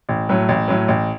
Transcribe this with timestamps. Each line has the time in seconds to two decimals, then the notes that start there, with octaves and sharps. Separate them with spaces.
0.09 A1
0.29 A2 F#3
0.49 A1
0.68 A2 F#3
0.88 A1